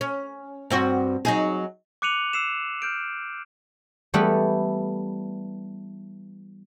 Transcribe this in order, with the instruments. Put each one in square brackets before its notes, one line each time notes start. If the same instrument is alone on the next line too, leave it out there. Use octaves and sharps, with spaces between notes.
[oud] C#4
G2 C4 F#4
F#3 D#4 G#4
[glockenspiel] D6 F#6 C#7 D#7 F7 F#7
E6 C7 E7
F6 G6 D7
[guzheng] E3 G3 A3 B3 E4